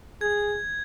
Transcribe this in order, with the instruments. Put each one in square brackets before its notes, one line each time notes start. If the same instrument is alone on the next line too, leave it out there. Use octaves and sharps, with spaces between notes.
[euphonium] G#4 [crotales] G#6